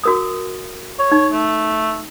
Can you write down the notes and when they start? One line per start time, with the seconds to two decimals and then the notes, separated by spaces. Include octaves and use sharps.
0.04 F#4 A#4 D#6
0.99 C#5
1.12 D#4
1.32 A3